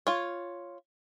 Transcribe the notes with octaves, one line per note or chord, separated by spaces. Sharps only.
F4 C#5